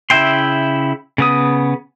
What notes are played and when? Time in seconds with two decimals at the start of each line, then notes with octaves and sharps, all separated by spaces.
0.10 C#3 E4 E5 G5 C6
1.18 C#3 B3 D#6